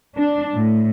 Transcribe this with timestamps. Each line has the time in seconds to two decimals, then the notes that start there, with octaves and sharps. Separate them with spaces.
0.17 D4
0.55 A2